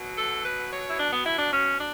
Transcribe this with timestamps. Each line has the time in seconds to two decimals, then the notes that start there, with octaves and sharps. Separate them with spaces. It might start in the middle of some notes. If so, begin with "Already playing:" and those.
Already playing: B2 F#3
0.17 A4
0.43 B4
0.71 C#5
0.88 E4
0.98 D4
1.11 B3
1.24 E4
1.38 D4
1.51 C#4
1.78 D4